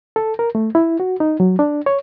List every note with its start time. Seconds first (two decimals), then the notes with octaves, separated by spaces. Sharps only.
0.16 A4
0.39 A#4
0.55 A3
0.75 E4
1.00 F#4
1.20 D#4
1.40 F#3
1.59 D4
1.86 C#5